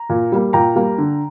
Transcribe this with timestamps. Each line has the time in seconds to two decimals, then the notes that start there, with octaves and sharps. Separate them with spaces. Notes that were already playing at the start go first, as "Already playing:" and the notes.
Already playing: A#5
0.09 A#2
0.32 G3 A#3
0.53 A#2 G5 A#5
0.75 G3 A#3
0.98 D3